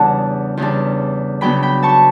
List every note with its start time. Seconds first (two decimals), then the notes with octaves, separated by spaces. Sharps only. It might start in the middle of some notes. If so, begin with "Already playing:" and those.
Already playing: E2 C#3 G3 D4 F#5 A5
0.57 E2 C#3 G3 D4
1.41 C#3 F#3 B3 D4 G5 B5
1.63 G5 B5
1.83 A5 C#6